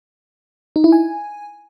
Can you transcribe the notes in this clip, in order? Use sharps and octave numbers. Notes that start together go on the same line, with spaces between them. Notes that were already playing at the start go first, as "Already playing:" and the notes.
D#4
E4
G#5